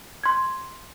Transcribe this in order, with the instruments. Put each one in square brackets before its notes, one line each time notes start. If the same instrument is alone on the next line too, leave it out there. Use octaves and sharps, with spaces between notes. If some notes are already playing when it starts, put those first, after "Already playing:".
[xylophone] C6 G#6